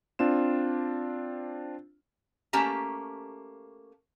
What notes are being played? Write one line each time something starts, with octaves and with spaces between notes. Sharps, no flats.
C4 D4 F4 E7
A3 A#3 C#4 G4 A5 A#5